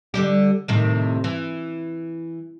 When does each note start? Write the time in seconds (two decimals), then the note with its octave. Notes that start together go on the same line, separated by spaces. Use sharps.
0.14 D3 G3 G4
0.68 A2 C3 D#3
1.24 E3